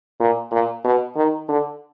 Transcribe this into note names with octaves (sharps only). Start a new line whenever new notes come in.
A#2
A#2
B2
D#3
D3